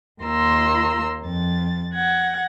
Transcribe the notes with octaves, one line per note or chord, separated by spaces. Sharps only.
D#2 A#3 F4 A#5 C6 E6
F2 A6
F#5 G#6 A#6